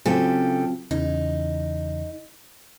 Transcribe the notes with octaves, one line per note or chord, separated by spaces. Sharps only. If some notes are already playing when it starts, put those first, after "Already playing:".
C#3 F#3 C4 F4 G4 A4
E2 C#3 E3 D#4